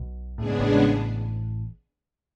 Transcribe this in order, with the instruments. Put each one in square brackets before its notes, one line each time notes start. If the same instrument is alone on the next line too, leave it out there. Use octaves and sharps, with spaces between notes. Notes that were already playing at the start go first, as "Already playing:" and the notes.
Already playing: [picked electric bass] B1 B2
[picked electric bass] A2 [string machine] C#3 G#3 B3 D4 G#4
[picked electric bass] G#2
A1 A2